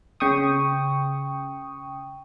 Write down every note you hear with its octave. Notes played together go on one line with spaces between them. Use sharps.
C#3 G5 C#6 D#6